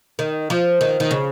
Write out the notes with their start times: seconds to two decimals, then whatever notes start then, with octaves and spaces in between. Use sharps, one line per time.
0.19 D#3
0.50 F3
0.81 D#3
1.00 D#3
1.11 C#3